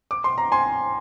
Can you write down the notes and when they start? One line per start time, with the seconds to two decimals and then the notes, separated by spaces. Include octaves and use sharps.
0.11 D6
0.24 C6
0.38 A#5
0.52 G#5 C6